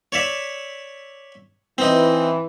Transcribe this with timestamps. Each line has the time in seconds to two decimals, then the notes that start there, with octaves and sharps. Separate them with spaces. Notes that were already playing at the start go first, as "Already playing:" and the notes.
0.12 C#5 D5 E5
1.78 E3 C4 D#4